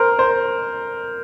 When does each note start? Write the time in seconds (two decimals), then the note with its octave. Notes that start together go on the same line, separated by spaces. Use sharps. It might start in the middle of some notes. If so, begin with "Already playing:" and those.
Already playing: A#4 C5
0.19 C5